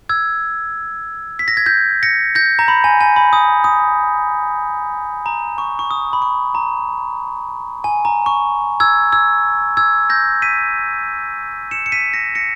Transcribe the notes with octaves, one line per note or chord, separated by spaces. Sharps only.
E6 G#6
B6
A#6
G#6
G6 A#6
A#6 C#7
G6 A#6
A#5
B5
G#5
G#5
B5
D#6
D#6
A#5
C#6
C#6
D#6
B5
C#6
A#5
G#5
A#5
C#6
E6 G#6
E6 G#6
E6 G#6
G6 A#6
B6 D#7
C#7 E7
C#7
B6 D#7
A#6 C#7
A#6 C#7